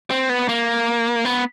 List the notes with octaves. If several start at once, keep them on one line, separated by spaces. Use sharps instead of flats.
C4
B3
A#3
B3